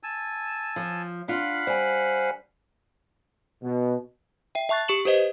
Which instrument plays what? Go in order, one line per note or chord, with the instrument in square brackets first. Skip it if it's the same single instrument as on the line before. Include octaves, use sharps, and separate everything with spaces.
[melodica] G#5 A5 E6
[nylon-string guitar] F3
[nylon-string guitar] D4 F4 [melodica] F5 F#5 B5
[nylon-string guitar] G3 [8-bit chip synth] C5 G#5
[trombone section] B2
[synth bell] E5 G5
E5 A5 C#6 F#6 A6
G4 C#6 C#7 E7 F#7
G4 B4 C5 D#5